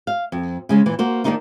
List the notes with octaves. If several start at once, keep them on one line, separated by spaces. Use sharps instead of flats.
F5
F2
C#3 G#3 C#4
A#2 E3
A#3 F#4 C5
D#3 E3 A#3 D4 D#4 F4